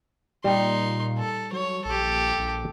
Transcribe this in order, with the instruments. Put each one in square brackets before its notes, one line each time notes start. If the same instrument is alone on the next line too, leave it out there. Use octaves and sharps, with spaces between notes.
[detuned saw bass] A#2 [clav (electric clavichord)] G3 [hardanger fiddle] D#4 C6
[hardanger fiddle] A4
[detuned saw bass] F#3 [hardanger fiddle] C#5
[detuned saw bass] A#1 [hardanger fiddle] G4 A4
[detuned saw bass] A#1